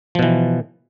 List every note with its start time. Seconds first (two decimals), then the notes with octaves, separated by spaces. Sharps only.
0.15 F3
0.19 B2
0.23 E3